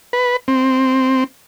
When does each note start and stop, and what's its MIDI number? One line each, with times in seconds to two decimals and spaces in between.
0.13 0.36 71
0.48 1.24 60